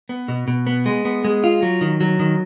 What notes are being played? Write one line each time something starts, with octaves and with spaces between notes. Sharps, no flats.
B3
B2
B2
B3
G#3
B3
G#3
F4
F#3
D#3
F#3
D#3